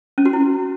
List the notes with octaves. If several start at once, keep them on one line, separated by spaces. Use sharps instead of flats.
C#4
F#4
E4